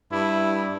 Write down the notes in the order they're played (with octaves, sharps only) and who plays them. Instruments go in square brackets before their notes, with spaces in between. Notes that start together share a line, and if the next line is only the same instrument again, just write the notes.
[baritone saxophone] G2 [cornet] E4